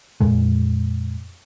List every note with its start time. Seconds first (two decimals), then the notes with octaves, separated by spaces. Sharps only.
0.21 F2 A#2 G#3